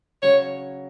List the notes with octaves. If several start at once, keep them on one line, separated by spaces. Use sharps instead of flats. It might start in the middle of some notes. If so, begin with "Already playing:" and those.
C#3 F#3 C#5